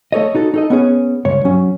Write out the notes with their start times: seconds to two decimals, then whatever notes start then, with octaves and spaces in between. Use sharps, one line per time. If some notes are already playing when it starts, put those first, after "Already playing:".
0.12 A3 A4 C#5 D#5
0.35 D#4 F#4 A4
0.54 D#4 A4 D#5
0.70 B3 C#4 G#4
1.25 C#2 G2 C#5
1.45 F#3 C#4